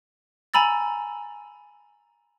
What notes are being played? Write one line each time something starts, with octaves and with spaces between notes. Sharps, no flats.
G#5 A#5 B5 E6 A6